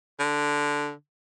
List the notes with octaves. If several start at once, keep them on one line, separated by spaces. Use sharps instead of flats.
D3